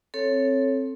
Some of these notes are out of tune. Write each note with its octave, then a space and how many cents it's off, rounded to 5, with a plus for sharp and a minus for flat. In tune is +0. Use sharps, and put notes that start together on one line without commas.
C4 +15 A4 +0 C#5 +0